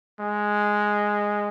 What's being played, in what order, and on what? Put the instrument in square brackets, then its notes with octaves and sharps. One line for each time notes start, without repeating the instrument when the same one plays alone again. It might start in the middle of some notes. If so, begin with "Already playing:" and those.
[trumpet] G#3